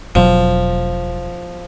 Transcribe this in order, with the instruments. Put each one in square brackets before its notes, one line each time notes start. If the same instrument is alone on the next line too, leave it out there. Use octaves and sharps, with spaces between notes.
[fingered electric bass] E1 B2 F#3 [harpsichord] F3